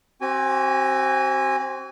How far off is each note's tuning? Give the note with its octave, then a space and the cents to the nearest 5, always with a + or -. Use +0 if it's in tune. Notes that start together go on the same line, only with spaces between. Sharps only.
C4 +20 F#4 +45 G#5 -20